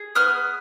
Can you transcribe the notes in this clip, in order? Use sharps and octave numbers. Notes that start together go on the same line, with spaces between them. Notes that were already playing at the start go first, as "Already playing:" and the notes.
Already playing: G#4
B3 D#6 F6